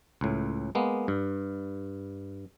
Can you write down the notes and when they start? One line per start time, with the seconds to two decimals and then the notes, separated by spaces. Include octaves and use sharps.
0.21 C#2 A2
0.75 G#3 A#3 B3
1.08 G2